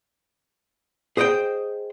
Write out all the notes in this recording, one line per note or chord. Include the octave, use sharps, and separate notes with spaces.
G#4 C5 D#5 F#5 G5